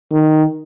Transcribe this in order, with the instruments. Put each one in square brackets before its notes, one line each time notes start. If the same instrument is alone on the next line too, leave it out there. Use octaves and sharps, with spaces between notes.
[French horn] D#3